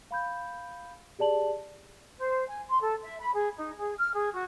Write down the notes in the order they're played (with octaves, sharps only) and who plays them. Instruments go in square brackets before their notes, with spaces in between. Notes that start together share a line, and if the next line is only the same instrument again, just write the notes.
[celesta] F5 B5 G6
G4 G#4 D5 A5 F#7
[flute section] C5
G#5
C6
A4
E5
B5
G#4
D#4
G#4
F6
G#4
F#4